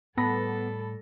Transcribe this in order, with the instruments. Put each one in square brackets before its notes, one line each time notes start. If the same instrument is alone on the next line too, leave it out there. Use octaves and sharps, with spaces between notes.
[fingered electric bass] A2 [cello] G3 A4 [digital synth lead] B3 [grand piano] A5 B5 A#6